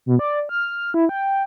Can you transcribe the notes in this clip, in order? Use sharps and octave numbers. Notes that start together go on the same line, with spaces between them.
B2
D5
F6
E4
G5